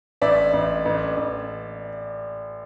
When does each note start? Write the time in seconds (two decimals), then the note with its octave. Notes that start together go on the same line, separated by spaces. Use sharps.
0.22 A1 D5 E5
0.53 A1
0.85 A1
1.17 A1